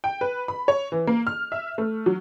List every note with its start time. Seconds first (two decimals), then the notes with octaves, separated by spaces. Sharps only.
0.04 G5
0.21 B4
0.48 B5
0.68 C#5
0.92 E3
1.07 A#3
1.27 F6
1.52 E5
1.78 A3
2.06 F#3